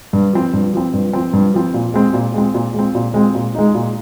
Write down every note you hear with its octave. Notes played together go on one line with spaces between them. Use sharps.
G2
F3 C4
G2
F3 C4
G2
F3 C4
G2
F3 C4
A#2
G#3 C4
A#2
G#3 C4
A#2
G#3 C4
A#2
G#3 C4
A#2
G#3 D#4
A#2